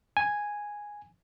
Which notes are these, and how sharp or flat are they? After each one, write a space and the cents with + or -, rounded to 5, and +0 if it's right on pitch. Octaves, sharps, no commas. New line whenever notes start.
G#5 -5